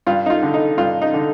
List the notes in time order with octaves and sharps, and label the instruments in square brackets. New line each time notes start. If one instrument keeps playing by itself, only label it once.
[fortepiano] G2 F4
D#4
F4
D3
D#4
G2 F4
D#4
D3